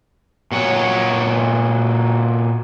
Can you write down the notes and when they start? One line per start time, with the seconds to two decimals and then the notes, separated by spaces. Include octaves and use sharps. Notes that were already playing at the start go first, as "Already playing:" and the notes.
0.52 A#2 F#4 C#5